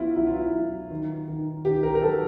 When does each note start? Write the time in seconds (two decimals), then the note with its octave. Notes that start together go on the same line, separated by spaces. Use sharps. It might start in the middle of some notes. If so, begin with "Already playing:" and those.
Already playing: F#3 B3 E4 F4
0.16 F#3 E4
0.27 F4
0.37 E4
0.54 F#3
0.91 D#3
1.28 D#3
1.65 D#3 G4
1.83 A#4
1.95 A#4
2.02 F#3 A4